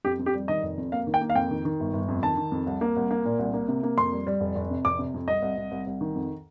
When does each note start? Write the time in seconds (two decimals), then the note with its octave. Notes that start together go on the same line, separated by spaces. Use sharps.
0.05 F2 G4
0.19 F2
0.26 G4
0.34 G3
0.48 D#3 D#5
0.63 F1
0.78 F2
0.92 A#3 F5
1.07 D#3
1.14 G5
1.21 A#3
1.30 F5
1.35 F2 G5
1.51 D#3
1.65 D#3
1.80 G1
1.93 G1
2.08 F2
2.23 D#3 A5
2.37 D#3
2.52 F2
2.66 C2
2.81 A#3
2.96 C2
3.11 A#3
3.25 A#2
3.39 C2
3.54 A#3
3.68 C3
3.83 A#3
3.98 F2 C6
4.12 G3
4.27 G3
4.41 F1
4.56 F1
4.70 C3
4.85 F1 D6
4.99 C3
5.14 F2
5.27 C2 D#5
5.42 C2
5.57 C2
5.71 C2
5.87 C2
6.01 D#3
6.15 F2